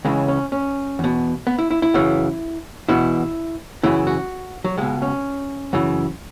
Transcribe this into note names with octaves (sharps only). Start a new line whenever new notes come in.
C#2 C#3 E3 G#3
C#4
C#4
E2 B2
B3
E4
E4
E4
F#2 C#3 E3
E2 B2 E4
F#2 C#3 E3 E4
F#4
F#3
C#2 B2 G#3
C#4
F#2 C#3 E3